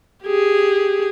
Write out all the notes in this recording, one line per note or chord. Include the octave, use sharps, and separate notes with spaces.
G4 G#4